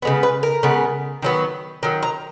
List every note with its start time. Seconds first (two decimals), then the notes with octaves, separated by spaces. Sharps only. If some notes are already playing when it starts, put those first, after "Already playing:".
0.02 C#3 G#3 B3
0.23 B4
0.43 A#4
0.63 C#3 G#3 B3
1.22 D#3 F#3 B3
1.83 D#3 F#3
2.03 A#5